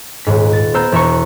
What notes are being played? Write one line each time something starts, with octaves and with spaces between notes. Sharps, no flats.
D#1 G#2 B6
A6
B3 C5 A#5 E6 G6
E1 E2 E5 A#5 C#6 C#7